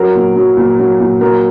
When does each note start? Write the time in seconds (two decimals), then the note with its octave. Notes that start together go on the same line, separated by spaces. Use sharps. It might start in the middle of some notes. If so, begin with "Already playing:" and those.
Already playing: F#3 A#4
0.15 A#2
0.36 F#3
0.57 A#2
0.79 F#3
1.00 A#2
1.21 F#3 A#4